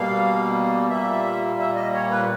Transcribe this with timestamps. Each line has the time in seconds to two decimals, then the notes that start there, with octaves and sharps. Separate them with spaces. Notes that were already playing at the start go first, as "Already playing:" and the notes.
Already playing: B2 G3 A#3 F5
0.90 A#2 G3 A#3 E5
1.59 E5
1.76 D#5
1.93 C#5
2.11 B4